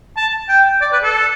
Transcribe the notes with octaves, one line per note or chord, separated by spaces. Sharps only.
A5
G5
D5
B4
A4